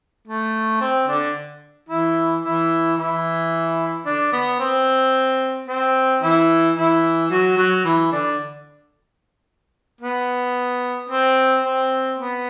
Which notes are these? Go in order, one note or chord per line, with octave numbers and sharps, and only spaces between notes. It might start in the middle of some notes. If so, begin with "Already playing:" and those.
A3
C4
D3 D4
E3 E4
E3 E4
E3 E4
D3 D4
B3
C4
C4
E3 E4
E3 E4
F#3 F#4
F#3 F#4
E3 E4
D3 D4
B3
C4
C4
B3